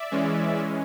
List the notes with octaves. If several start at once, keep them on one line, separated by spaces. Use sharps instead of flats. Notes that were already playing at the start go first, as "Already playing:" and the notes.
Already playing: D5 E5
E3 G#3 C#4